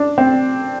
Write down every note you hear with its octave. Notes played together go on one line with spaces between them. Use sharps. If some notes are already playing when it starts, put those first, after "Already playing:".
Already playing: D4
C4